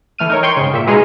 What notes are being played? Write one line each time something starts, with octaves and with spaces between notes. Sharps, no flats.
E3 A3 F6 D#7
D#4 A#4 C#5
G5 C6 C#6 G6 G#6
G#2 C#3
A#2 E5
B2 G#3 D#4 G#4 F6